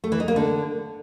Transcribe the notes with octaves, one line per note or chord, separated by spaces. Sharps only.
A3
E3
D#4
A#3
D3